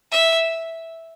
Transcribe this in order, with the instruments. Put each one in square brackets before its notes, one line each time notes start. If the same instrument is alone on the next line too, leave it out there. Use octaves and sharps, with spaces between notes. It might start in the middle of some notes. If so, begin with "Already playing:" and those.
[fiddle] E5